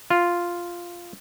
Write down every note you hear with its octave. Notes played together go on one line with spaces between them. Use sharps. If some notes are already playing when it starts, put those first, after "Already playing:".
F4